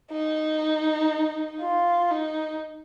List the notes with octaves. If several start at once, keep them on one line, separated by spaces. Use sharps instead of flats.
D#4
F4
D#4